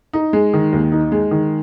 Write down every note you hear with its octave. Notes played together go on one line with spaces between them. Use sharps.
D#4
G#3
D#3
D#2
D#4
G#3
D#3